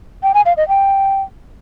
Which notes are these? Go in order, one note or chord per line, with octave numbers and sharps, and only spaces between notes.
G5
G#5
F5
D#5
G5